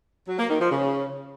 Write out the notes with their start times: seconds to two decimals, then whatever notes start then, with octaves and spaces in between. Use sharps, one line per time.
0.28 F#3
0.39 A#3
0.50 D#3
0.61 F3
0.72 C#3